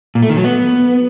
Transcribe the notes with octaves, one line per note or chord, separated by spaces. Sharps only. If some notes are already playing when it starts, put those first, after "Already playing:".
A#2
A3
D#3
F#3
B3